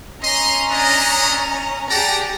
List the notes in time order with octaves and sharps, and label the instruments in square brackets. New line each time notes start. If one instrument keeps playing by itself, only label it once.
[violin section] C#4 A#5 [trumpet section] D#5 C6
[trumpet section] D4 E4 D#5
[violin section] G4 G#4 A5 [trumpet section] D5 F#5 A#5